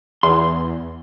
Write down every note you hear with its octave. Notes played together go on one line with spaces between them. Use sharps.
E2 C6